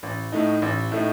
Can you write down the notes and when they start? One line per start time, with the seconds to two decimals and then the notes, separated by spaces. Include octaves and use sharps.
0.03 A1
0.32 A2 A3 D#4
0.62 A1
0.92 A2 A3 D#4